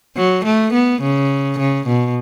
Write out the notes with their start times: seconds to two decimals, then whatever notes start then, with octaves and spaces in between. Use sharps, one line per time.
0.16 F#3
0.45 A3
0.73 B3
1.02 C#3
1.59 C#3
1.87 B2